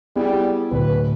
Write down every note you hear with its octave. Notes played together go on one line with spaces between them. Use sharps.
G3 B3 E4 G#4
D1 B4